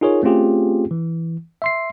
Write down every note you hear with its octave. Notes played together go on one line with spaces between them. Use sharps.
D#4 F4 G#4 A#4 C#5
A3 C4 C#4 F4 G4 G#4
E3
E5 C6 C7